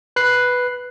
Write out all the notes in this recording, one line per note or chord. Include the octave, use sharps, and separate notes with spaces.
B4 F#6 C7